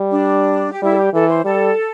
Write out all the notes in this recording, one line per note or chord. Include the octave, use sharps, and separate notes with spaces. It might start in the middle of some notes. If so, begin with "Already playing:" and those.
Already playing: G3
D4
G4
G3 E4
A4
G4
E3 A4
C5
G3 A4